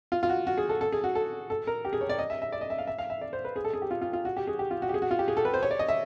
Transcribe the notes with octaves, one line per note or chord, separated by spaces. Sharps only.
F4
F4
F#4
F#4
G#4
A4
A4
G#4
F#4
A4
A4
A#4
G4
G#4
C#5
D5
D#5
E5
E5
D5
D#5
E5
F5
E5
F5
E5
D5
C5
B4
G#4
A4
G#4
G4
F4
F4
F4
F#4
G4
G#4
G4
F4
F#4
G4
G#4
F#4
F4
G4
G#4
A4
B4
C5
C#5
D5
D#5
E5